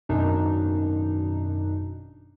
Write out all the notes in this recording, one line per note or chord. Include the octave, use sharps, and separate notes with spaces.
G#1 F#2 B2 D4 D#4